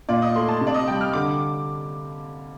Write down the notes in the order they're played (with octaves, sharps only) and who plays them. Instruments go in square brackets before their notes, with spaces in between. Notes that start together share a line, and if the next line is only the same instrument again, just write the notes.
[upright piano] A#2 [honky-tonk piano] D5
[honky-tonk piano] D#5
[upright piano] A3 [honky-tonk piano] C6
[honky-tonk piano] A5
[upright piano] C3
[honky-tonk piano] D5
D#5
[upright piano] G3 [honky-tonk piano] G5
[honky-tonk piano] F6
[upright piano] D3 [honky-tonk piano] D6